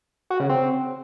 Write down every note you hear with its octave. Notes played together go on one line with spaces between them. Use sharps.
F#4
C#3
C4